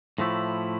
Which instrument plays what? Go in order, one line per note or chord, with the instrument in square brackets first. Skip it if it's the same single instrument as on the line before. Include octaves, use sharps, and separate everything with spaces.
[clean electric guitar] A2 F3 A3 E4